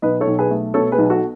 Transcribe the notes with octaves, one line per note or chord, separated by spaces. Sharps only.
B1 B4 D#5
A4 C#5
B1
G#4 B4
A3
B2 A4 C#5
G#4 B4
B1
F#4 A4